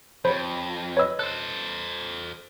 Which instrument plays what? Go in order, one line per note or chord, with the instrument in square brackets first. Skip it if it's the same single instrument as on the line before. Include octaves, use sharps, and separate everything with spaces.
[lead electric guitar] F2 [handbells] C5 [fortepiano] C#5 B5
[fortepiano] B4 D#5 [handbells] C#5 E6
[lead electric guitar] A4 C5 [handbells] F#6